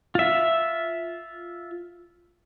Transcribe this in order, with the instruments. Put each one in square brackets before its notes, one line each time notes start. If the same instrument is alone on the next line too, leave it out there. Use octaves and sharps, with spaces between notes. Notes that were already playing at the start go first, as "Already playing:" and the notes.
[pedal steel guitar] F4 E5